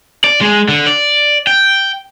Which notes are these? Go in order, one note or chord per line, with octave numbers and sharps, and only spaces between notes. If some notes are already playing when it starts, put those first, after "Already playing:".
D5
G#3
D3
D5
G5